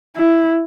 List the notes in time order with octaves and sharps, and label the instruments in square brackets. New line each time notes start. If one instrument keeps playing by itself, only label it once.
[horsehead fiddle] E4